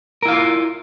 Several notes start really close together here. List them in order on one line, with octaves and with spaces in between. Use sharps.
A#4 E4 F5 F4